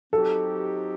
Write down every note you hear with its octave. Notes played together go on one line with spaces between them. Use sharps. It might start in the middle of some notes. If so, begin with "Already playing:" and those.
F#3 C4 D#4 G4 A4